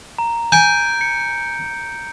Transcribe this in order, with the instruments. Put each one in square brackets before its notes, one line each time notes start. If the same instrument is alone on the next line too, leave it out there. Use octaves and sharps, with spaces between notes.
[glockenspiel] A#5
[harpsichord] G#5 [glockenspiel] G6 D7
[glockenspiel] C#7